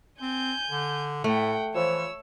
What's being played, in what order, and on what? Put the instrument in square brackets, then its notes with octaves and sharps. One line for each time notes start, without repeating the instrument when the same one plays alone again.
[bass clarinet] C4 [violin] G#5 G6
[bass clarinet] D3
[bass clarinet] A2 [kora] A3 [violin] F#5 G5
[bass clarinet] E3 [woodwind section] F3 [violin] C#5 E6